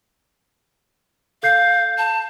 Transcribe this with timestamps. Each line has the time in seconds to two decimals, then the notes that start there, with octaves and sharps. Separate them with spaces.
1.43 A4 F5 G6 C7
1.98 A5